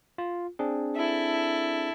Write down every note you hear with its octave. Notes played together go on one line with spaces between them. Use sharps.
F4
C4 D4 G#4
E4 A4